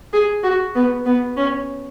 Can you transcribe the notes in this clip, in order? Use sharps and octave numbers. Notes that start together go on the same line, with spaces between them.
G#4
F#4
B3
B3
C#4